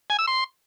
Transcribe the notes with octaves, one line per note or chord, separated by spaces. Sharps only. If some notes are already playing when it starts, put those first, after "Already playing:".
G#5
E6
C6